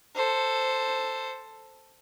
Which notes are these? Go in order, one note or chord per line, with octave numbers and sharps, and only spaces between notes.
A4 C5